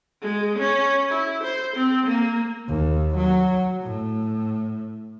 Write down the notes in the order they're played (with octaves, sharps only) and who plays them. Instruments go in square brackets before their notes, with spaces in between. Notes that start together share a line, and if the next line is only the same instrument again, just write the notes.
[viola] G#3
C#4
E4
C5
C4
A#3
[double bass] D#2
F#3
A2